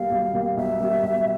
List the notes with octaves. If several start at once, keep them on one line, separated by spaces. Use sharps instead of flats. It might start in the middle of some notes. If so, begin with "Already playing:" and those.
Already playing: B1 B2 G3 A#3 F5
B1
B2 G3 A#3
B1 E5
B2 G3 A#3
B1